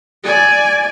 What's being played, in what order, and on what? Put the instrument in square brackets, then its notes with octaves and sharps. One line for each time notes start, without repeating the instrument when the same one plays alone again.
[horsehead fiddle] D5 G#5